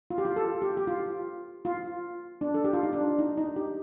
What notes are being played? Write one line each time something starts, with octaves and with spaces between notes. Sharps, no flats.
F4
G4
F4
A4
G4
G4
F4
F4
D4
A4
G4
F4
D#4
D4
D#4
D#4
G4